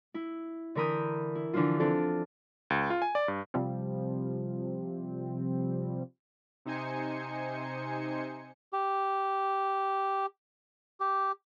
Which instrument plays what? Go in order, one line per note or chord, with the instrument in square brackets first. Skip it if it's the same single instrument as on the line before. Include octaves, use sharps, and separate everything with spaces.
[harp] E4
D3 E3 A#4 B5 D#6 G6
E4
D3 E3 F3 D4 F4
C4 D4 F4 A4 D5
[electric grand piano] C#2
F4
G#5
D5
G2
[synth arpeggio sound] C3 F3 G3 C4
[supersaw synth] C3 D#4 C5 G#5 C#7
[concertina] G4
G4